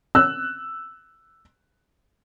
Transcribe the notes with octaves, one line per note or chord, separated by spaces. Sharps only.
E6 F#6